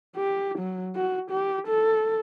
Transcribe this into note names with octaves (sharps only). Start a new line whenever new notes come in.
G4
F#3
F#4
G4
A4